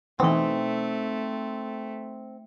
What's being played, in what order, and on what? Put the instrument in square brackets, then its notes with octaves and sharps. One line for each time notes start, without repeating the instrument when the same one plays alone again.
[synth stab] B2 E3 [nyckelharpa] A3 [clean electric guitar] C4 [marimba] D#4 G5